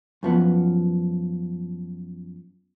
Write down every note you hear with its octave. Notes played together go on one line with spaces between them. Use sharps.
F#2 F3 B3